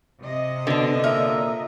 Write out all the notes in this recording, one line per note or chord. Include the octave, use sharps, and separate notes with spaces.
C3 D#5
B2 D3 D4
A#2 A#4 E5